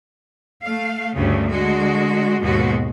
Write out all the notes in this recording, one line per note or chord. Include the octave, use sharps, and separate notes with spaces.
A3 F5
D2 G2 C#3 A3
D3 G#3 F#4
D#2 G#2 B2 G#3 F#4